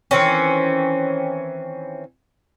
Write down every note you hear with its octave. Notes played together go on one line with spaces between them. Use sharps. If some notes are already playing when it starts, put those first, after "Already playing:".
D#3 E3 C4 C#4